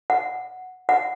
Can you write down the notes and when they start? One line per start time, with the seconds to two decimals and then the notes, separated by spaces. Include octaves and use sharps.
0.10 F#5
0.89 F#5